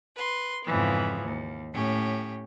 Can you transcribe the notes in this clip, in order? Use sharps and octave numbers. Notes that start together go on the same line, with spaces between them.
B4 C6
F2 G#2 C#3 E3 F3 B3
D#2
A2 C#4 G4